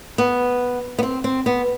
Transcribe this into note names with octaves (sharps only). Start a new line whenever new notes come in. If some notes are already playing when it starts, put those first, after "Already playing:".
B3
B3
C4
C4
B3